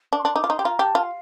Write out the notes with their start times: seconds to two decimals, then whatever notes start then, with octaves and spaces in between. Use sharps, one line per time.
0.13 D4 D6
0.19 C6
0.25 D4
0.35 D#4 D6
0.44 F4
0.50 D#4 C6
0.59 G4
0.64 F4 A#5
0.79 G4 A5
0.95 F4
1.03 F5